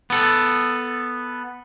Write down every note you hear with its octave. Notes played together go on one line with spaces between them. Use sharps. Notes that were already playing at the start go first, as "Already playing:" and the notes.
B3 A4